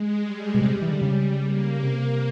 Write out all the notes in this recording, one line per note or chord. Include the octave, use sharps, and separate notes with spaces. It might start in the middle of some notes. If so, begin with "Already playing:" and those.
Already playing: G#3
G3
B2
C3 G3
E3
D3
C#3
A#3
C3 A#3